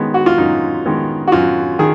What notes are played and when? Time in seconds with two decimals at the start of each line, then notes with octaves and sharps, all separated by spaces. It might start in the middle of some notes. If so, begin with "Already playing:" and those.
Already playing: F#2 D#3 G#3 B3
0.14 F#4
0.26 F4
0.38 F#2 D#4
0.86 D#3 G#3 B3
1.28 F#4
1.32 F#2 F4
1.79 D#3 G#4